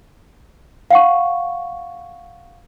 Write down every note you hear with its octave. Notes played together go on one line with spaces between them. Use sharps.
F5 F#5 C#6